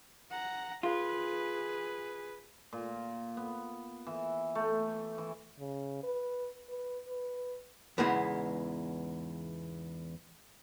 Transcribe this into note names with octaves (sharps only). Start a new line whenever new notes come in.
F#5 A#5
F4 G#4 B4
A#2
B3
E3
A3
E3
C#3
B4
B4
B4
E2 G#2 C#3 G#3 B3 E4